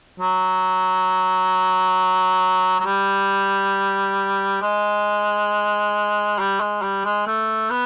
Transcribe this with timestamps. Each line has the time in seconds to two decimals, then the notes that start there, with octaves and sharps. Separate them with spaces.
0.20 F#3
2.80 F#3
2.85 G3
4.62 G#3
6.39 G3
6.60 G#3
6.82 G3
7.05 G#3
7.27 A3
7.71 B3